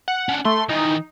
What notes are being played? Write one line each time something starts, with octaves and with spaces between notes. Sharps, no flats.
F#5
C#4 D4
A3 C6
D#3 E3 D#4